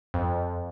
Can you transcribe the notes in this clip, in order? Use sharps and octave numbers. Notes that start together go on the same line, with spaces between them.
F2